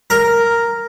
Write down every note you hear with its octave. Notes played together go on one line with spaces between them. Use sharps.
A#4